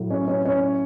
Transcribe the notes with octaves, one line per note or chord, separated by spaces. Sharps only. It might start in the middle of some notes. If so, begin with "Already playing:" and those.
Already playing: A2 F#3
C#4 C#5
C#4 C#5
C#4 C#5